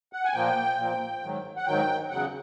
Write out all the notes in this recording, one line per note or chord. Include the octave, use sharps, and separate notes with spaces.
F#5
G#5
A#2 F3 A#3 G5
A#2 F3 A#3
G#2 D#3 F#3
F#5
G#2 D#3 F#3 G5
E2 C#3 F#3 F#5